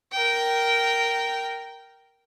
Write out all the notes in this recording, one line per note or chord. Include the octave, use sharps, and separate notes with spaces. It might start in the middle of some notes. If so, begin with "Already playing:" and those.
A#4 G5